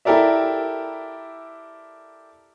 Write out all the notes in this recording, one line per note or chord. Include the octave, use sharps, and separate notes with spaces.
E4 G4 A4 A#4 D5 E5